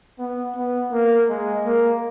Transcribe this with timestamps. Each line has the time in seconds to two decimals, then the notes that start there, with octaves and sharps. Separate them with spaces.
0.19 B3
0.56 B3
0.92 A#3
1.29 G#3
1.65 A#3